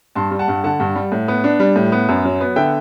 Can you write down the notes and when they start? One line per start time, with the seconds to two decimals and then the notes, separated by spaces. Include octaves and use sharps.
0.15 G2 A5 C6
0.31 G3
0.39 F#5 A5
0.48 G2
0.64 D3 F#5 A5
0.80 G2
0.96 G3
1.12 A2
1.28 B3
1.44 D4
1.60 G3
1.76 A2
1.92 B3
2.09 F#2
2.25 F#3
2.41 B3
2.56 D3 E5 G5